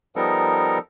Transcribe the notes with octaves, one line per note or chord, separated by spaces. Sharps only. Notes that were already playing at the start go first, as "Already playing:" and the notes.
F3 G3 B3 D#4 A4 A#4